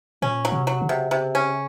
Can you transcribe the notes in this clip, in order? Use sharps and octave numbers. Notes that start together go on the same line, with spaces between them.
A#2 C#4
F#3
C3
F#3
C#3
C3
C3
C#4